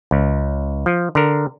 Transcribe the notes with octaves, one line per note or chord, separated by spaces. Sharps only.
C#2
F3
D3 A#4